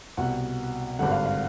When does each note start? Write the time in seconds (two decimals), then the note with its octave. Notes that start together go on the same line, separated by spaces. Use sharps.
0.17 C2 B2 F#5
0.99 G#1 G2 D3 F#5
1.12 F5
1.26 F5